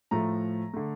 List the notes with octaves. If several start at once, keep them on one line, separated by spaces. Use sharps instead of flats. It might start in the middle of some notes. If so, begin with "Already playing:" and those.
A2 F3 A3 A#5
D3 A3